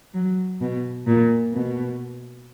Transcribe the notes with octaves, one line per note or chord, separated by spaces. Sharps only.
F#3
B2
A#2
B2